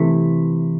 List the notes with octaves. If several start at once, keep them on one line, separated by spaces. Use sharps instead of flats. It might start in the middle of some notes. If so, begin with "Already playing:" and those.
Already playing: C3 E3 A3